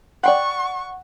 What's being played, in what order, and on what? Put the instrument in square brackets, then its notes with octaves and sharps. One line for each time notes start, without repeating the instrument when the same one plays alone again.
[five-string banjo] D5 G5 B5 [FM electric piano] F#5 [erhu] C#6